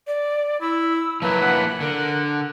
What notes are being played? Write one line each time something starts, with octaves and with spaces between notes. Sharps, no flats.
D5
E4 E6
F3 F#3 A#3 E4 B4
F#5
D3 A#4